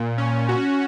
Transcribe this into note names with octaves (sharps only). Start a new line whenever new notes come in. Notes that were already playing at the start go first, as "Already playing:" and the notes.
Already playing: A#2
C#4
F#4